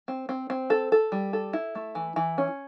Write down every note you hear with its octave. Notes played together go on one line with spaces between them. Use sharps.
C4
C4
C4
A4
A4
G3
A4
E4
A3
E3
E3
C#4